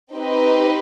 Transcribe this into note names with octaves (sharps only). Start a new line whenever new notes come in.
C4 D#4 G4 B4